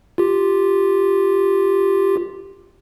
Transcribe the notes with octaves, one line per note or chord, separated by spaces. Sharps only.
F4 G4